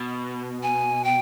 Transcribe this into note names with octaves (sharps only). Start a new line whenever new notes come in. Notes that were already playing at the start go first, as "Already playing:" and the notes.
Already playing: B2
G#5
G5